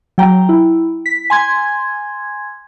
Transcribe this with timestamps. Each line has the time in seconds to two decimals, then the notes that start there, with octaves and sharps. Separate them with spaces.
0.18 F#3 G5 A#5
0.49 E4
1.06 B6
1.30 G#5 C6 G#6